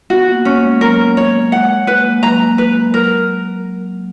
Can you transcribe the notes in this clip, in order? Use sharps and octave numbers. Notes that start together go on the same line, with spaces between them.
B3 F#4
A#3
C#4
G#3
F#3 A#4
C#5
G#3 F#5
B4
A#3
G#3
F#3 A#5
B4
F#3 A#4